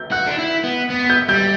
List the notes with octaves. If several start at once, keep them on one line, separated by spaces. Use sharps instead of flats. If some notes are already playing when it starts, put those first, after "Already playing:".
Already playing: G6
F#4 F#6
D4
E4
B3
B3
G6
G3 G6